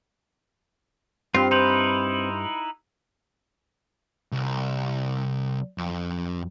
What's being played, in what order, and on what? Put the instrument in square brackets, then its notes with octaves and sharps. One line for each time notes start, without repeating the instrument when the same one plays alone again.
[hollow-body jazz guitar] G2 [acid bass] C4 [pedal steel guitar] F4
[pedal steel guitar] D#4 E4 B4 [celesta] C6 G6 F7
[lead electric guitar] C2
F2